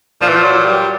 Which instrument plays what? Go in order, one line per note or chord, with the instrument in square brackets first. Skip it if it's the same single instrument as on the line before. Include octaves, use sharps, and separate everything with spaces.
[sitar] A#2 [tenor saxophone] F3
[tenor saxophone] E3
F3
F#3
G3